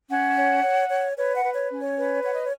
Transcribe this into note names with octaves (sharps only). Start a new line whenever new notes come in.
C#4 F#5
C#5
C#5
C#5
B4 C#5
F#5
B4
C#5
C#4
C#5
B4
C#5 F#5
D#5
C#5